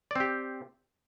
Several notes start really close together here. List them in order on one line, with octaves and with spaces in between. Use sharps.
D5 C4 G4